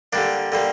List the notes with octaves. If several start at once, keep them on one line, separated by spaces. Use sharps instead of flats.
D3 G3 A#3 D4
D3 G3 A#3